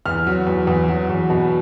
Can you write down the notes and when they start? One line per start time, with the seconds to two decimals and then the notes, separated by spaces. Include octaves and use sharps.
0.06 E2 F6
0.27 F#3
0.47 E2
0.67 E2
0.88 F#3
1.09 E2
1.30 B2